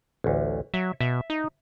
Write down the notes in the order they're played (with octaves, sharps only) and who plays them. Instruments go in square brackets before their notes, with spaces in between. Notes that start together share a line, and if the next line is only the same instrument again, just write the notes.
[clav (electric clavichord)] A1 D2
[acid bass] F#3 [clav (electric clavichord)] E5
[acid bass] B2 [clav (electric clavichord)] E5
[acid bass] D#4